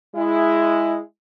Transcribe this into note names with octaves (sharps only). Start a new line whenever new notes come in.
G#3 E4